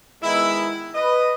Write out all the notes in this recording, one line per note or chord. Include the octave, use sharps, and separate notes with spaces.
D#3 G#3 B3 E4
B4 D#5